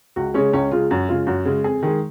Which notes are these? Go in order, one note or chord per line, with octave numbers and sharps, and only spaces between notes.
C#2 F#4
C#3 G#3 C#4
C#2 C#4
C#3 G#3 F4
F#2 F#4
C#3 G#3 F4
F#2 F#4
C#3 G#3
F2 G#4
D#3 G#3